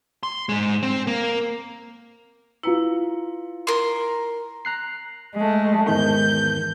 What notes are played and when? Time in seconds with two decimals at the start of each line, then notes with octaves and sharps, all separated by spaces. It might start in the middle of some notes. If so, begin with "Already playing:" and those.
0.23 C6
0.49 G#2 G#3
0.83 C4
1.07 A#3
2.63 E4 F4 B4 A#5 C#7
3.67 A#4 C6
4.65 A#5 F#6 C7
5.36 G#3 A3
5.88 E2 G#2 D#3 G6